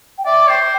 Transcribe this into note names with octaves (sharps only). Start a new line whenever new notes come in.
G5
D5 E5
C5 G5